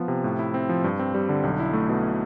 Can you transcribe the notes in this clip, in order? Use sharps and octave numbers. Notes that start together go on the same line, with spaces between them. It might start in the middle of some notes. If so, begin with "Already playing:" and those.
Already playing: F3 B3
C3
A2
E4
C4
F3
G2
C4
G3
D3
B1
E4
A3
B2